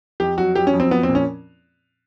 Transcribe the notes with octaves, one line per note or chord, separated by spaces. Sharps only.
F2 G4
F#3 F#4
F#3 G4
C#4
F2
C4
F3 B3
C4
A#2
C#4